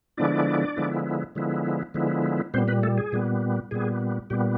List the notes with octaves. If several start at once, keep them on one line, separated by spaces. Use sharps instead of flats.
D3 F3 G#3 B3 D4 E4 D5
D3 F3 G#3 B3 E4
D3 F3 G#3 B3 E4
D3 F3 G#3 B3 E4
A#2 G3 B3 C4 C5
B3 B4
A3 A4
G#4
A#2 G3 B3
A#2 G3 B3 G#4
A#2 G3 B3 G4